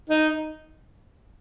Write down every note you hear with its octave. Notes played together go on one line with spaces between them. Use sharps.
D#4